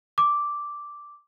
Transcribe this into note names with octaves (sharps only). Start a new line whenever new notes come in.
D6